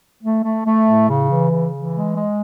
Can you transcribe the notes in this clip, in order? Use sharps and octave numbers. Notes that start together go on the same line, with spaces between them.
A3
A3
A3
A2
C#3
E3
C#3
E3
G#3
G#3